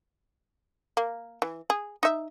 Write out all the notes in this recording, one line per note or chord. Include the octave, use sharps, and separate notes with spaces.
A#3
E3
G#4
D#4 E5